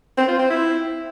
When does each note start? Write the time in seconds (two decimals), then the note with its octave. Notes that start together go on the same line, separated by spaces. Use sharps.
0.17 C4
0.28 F4
0.39 C4
0.50 E4